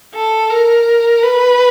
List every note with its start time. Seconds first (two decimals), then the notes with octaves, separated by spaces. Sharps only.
0.14 A4
0.50 A#4
1.22 B4